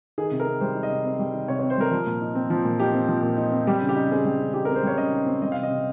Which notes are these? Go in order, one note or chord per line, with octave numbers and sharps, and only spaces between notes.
D#3 G#4
C3
A#4
C4
G3 C5
D#3
D#5
C3
C4
G3
D#3
C3 C#5
C#5
C4
C5
G3 A#4
F3
A#2
D#4
C4
F3
A#2
D#4 G4
C4
F3
A#2
D#4
C4
G3 G4
C#3
G4
D#4
C4 G#4
G3
C#3
D#4 G4
A#4
C4
C5
G3 C#5
C#3 D#5
D#4
C4
G3 D#5
F5
C3
D#5
C3